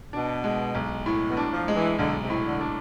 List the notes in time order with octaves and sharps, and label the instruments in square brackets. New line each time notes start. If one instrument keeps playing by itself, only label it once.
[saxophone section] B2 [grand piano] D4
[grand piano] G#3
B1
A2
[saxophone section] B2
[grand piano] D4
[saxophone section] F3
[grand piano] G#3
[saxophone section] E3
[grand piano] B1 [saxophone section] D3
[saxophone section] C3
[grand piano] A2
[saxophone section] D3
[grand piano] D4